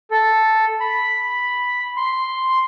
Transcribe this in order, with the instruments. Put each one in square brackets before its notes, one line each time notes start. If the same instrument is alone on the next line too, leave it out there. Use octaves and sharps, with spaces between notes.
[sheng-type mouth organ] A4
B5
C6